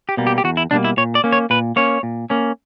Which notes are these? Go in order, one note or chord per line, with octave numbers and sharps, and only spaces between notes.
G4
B2 G3 A#3
G4
G4
E2 F#4
E4
B2 G3 A#3 D4
E4
A#2 C#5
D5
A#3 C#4
C#5
A#2 B4
A#3 C#4 C#5
A#2
A#3 C#4